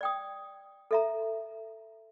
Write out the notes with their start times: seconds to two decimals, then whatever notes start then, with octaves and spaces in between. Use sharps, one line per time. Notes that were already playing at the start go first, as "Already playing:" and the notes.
0.01 D5 G5 D#6
0.91 A4 E5 A#5